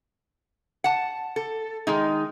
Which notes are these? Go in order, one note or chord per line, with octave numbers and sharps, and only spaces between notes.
F#5 A5
A4
D#3 G#3 D#4